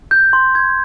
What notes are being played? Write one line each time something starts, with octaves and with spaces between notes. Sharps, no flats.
G6
C6
G#6